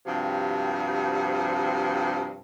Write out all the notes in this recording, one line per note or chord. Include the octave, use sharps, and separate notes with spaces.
G2 C3 F3 F#4